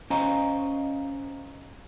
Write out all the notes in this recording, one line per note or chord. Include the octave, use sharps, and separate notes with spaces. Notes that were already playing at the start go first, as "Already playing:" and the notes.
C#4 C5 D#5 F5 G#5 A#5